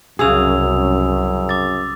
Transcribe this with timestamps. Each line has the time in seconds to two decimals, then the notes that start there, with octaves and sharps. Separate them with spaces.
0.19 C2 F#2 C#3 F#3 G#4 D#6 E6 F7
1.49 D6 A6